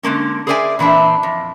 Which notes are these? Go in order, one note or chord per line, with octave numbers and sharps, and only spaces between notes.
D3 G#3 A#3 C#4
G#4 A#4 C5 D5 E5 G#5
A#2 E3 C4 D4 E5
F2